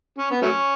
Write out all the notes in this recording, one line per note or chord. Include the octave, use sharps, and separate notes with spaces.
C#4
B3
F#3 A3 C#4